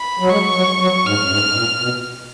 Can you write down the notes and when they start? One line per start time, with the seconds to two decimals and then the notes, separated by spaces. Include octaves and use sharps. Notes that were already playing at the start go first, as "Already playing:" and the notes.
Already playing: B5
0.20 F#3
0.30 G#3 C#6
0.55 F#3
0.80 F#3
1.06 G#2 F6
1.25 F#2
1.31 G#2
1.50 G#2
1.56 A#2
1.81 B2